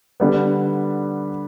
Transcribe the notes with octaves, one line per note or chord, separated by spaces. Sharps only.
D3 G3 B3